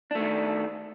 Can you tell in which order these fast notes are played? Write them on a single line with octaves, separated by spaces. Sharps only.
D4 A3 D#3